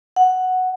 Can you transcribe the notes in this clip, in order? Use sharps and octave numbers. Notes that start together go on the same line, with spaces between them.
F#5